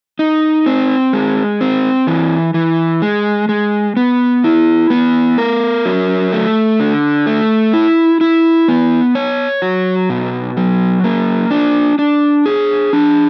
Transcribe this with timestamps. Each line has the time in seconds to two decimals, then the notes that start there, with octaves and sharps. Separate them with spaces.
0.19 D#4
0.66 C4
1.13 G#3
1.61 C4
2.07 E3
2.54 E3
3.02 G#3
3.49 G#3
3.97 B3
4.44 E4
4.90 B3
5.38 A#4
5.85 F#3
6.32 A3
6.80 D3
7.26 A3
7.73 E4
8.21 E4
8.68 B3
9.15 C#5
9.62 F#3
10.10 B2
10.57 F#3
11.04 A#3
11.51 D4
11.99 D4
12.46 G#4
12.93 D4